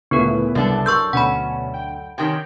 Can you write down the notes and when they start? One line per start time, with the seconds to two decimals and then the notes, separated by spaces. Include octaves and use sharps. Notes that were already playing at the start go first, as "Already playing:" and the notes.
0.11 D2 A#2 C#3 A3 B3 E4 A#4 B4
0.55 C2 F#2 D4 A4
0.86 A#4 C6 C#6 E6 G6
1.13 D2 B2 C#4 F#5 B5
1.74 G5
2.18 C3 D#3 C#4 G5 G6